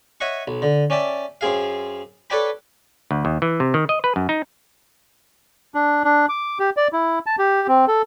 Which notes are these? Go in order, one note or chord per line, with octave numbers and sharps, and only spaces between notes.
C#5 D#5 E5 F#5 C#6
B1
D3
C#4 D5 E5 G5 A5
F#2 C4 G#4 F5
A4 B4 C#5 D5 G5 B5
D2
D#2
E3
C3
D#3
D#5
B4
F#2
D#4
D4
D4
D6
G4
D5
E4
A5
G4
C4
A4